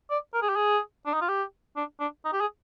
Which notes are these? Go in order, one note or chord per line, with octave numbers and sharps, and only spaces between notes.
D5
A#4
G#4
G4
G#4
D4
D#4
F4
G4
D4
D4
D#4
G4
G#4